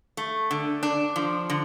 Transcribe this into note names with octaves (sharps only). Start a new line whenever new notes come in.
A3
D3
D4
F3
D3